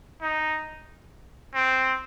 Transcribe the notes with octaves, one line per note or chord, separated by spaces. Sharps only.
D#4
C4